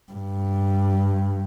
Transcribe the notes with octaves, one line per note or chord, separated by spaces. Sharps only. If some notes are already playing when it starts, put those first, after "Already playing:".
G2